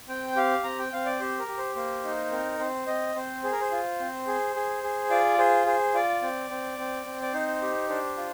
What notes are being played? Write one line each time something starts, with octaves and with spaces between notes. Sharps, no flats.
C4 G5
G4 F5
C4 A#5
G5
C4 F5
D5
G4 C5
A#4
G4
C5
A#3 C5
D#4
C4 A#4
C4 C5
C4 D#5
C4 C5
G#4 C5
A#4
C5
F4
C4
G#4
G#4
G#4
F4 D5
G#4 C5
G#4 C5
F4 D5
C4
C4
C4
C4
D5
D#4 C5
G4
D4 C5
F4